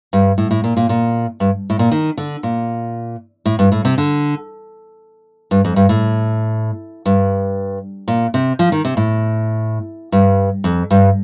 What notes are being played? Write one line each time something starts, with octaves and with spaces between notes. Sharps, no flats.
G2
A2
A2
A#2
A#2
A#2
G2
A2
A#2
D#3
D3
A#2
A2
G2
A2
C3
D3
G2
F2
G2
A2
G2
A#2
C3
F3
D#3
C3
A2
G2
F2
G2